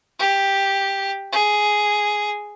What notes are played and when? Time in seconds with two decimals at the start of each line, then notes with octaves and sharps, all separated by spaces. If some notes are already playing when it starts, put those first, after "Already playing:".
0.19 G4
1.33 G#4